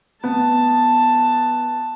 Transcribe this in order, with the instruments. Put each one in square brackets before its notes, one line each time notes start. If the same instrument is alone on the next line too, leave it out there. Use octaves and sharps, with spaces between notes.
[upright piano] B3 [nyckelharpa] A5